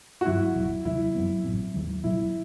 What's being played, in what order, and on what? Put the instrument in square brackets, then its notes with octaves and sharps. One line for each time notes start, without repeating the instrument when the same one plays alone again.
[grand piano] F#4
[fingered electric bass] G2 D#3 F#3 C4 [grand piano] E4
[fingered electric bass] F#1 E2 B2 F#3
[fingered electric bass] E2 C3 D#3 F#3 [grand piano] E4
[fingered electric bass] F#2 F#3 B3
A1 A2 F#3 C4
D#2 D#3 F#3
[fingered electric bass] E1 E2 B2 F#3 [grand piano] E4